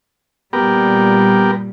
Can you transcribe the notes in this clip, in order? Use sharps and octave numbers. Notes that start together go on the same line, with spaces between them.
A#2 G3 B3 G4 A#4